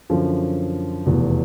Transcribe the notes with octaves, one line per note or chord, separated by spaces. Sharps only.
F#2 D3 F3
F1 E2 B2